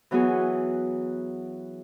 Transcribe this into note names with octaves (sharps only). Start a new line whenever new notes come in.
E3 F#3 B3 F#4 G#4